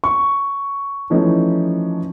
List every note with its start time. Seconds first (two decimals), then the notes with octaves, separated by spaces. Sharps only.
0.04 C#6
1.10 E3 F3 A3 C#4 D#4